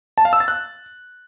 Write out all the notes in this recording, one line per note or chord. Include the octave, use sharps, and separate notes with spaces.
A5
F5
E6
A6
F#6